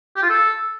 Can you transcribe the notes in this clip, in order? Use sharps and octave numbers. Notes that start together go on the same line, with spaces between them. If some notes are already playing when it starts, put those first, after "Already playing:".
G4
F4
A4